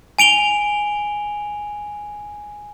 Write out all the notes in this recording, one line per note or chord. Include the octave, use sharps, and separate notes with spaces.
G#5 D7 F7 G7